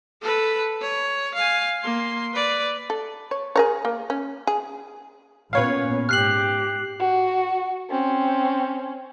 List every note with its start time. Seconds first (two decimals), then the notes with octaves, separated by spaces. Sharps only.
0.22 A4 B4
0.81 C#5
1.35 F5 G#5
1.80 A#3 C6
2.33 B4 D5
2.90 A4
3.31 C#5
3.56 G#4 A#4 C#5
3.85 A#3
4.10 C#4
4.47 G#4
5.53 A#2 B3 C#4 B4 C#5 F5
6.09 G#2 G4 F6 F#6 C7 F#7
7.00 F#4
7.90 C4 C#4